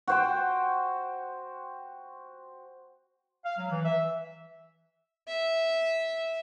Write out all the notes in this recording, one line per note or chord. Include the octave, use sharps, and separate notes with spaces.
F#4 C5 G5
F5
F#3
E3
E5
E5